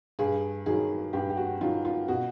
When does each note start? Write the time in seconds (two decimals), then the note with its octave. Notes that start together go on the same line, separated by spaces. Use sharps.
0.19 G2 G#4
0.66 D#3 F#3 G#4
1.13 G2 G4
1.30 G4
1.37 F#4
1.61 D#3 F#3 F4
1.85 F4
2.08 B2 F#4